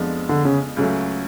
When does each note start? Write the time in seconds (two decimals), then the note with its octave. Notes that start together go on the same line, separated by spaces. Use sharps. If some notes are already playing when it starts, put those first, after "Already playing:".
Already playing: F2 F3 G#3 B3 D4
0.29 D3
0.45 C#3
0.77 C#2 C#3 F#3 A3